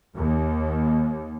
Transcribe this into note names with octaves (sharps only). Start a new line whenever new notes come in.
D#2